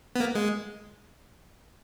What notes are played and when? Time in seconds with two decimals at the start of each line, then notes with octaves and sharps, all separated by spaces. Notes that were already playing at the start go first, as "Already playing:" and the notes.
0.16 B3
0.20 A#3
0.35 G#3